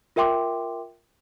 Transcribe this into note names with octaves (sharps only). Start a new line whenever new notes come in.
F4 A#4 E5 G5 C6 D6